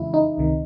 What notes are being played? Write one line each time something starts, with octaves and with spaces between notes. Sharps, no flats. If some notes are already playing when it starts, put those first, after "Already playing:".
Already playing: F2 C#3 E3 G#3 E4
D#4
C#2 C3 D#3